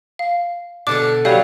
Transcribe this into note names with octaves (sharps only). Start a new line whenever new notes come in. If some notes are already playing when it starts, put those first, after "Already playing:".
F5
B2 D3 D4 A4 D6
F#3 G3 D5 F5